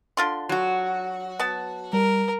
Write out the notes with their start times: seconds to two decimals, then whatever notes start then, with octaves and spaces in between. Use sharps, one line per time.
0.17 D3 F4 C6
0.49 F#3 F#4
1.39 B3 A5
1.93 G3 A#4